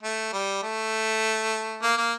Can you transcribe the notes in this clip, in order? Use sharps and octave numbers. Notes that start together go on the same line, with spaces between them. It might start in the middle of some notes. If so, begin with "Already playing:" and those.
A3
G3
A3
A#3
A#3